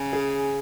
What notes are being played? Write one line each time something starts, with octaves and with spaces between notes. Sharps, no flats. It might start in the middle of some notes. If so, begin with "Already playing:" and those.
Already playing: C#3
G#4